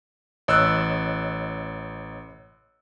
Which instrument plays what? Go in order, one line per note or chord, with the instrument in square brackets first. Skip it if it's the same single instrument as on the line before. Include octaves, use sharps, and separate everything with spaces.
[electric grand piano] A1 E6 F#6 [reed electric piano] C#5 D#5